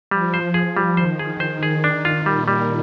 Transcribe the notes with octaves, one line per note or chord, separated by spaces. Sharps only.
F3 G3
C5
F3 G#4
G3
D#3 C5
G#4
C5
G#4
D4
F4
A#2 G3
G3